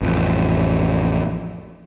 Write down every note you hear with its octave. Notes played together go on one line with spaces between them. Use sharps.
A1 F2